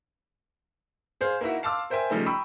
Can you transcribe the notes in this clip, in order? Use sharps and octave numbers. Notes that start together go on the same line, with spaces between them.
G#4 C5 F5
A#3 D#4 E4 F#4
F5 A5 C6 D6 E6
A#4 C5 E5 G5 G#5
C#3 F3 G3 A3 D#4
G5 A#5 B5 C#6 D#6 E6